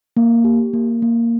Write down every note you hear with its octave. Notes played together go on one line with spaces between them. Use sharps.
A#3
G4
A#3
A#3